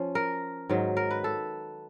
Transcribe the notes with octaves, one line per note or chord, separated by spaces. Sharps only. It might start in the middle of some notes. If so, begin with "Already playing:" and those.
Already playing: F3 C#4
A#4
G#2 D#3 F#3
A#4
B4
A4